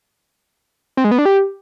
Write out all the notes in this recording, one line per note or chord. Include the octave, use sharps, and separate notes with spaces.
C4
G#3
B3
D4
G4